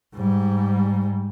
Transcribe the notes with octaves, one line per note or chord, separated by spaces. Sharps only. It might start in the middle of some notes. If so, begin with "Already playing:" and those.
G#2 G3